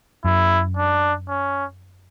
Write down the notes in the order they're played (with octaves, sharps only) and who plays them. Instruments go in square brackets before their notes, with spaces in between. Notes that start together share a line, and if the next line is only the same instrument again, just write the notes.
[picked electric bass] F#2 [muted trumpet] E4
[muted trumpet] D4
C#4